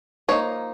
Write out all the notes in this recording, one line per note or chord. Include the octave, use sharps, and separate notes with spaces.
F3 A#3 D#4 C#5